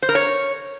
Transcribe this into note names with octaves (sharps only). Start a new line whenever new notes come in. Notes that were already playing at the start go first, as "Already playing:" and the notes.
C5
A#4
C#5